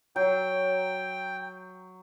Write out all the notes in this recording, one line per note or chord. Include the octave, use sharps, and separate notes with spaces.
F#3 G5